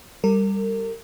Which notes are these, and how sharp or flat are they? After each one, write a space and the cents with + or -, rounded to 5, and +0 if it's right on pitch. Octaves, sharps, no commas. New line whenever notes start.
G3 +5 A#4 -35